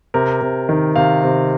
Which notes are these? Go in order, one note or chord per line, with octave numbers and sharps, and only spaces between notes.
C3 A#4
C3
D#3
C3 F5
C3